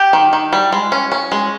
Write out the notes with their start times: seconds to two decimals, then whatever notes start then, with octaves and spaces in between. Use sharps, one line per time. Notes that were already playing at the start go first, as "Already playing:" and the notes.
Already playing: G4
0.13 D#3
0.33 D#3
0.53 G3
0.72 G#3
0.92 C#4
1.12 C#4
1.32 G#3